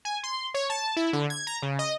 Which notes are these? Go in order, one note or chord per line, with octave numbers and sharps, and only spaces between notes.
G#5
C6
C#5
A5
E4
D3
G#6
A#5
C#3
D#5